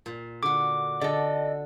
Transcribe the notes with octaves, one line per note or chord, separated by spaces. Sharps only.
A#2
D3 F#4 D6
D3 A4 D5 D#5